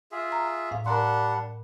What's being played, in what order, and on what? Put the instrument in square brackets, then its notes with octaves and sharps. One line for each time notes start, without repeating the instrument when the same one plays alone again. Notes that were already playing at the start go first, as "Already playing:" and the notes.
[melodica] F4 G#4 E5
[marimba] A#5
A2 F5
[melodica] G3 D4 F#5 [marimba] A#4 A#5 C6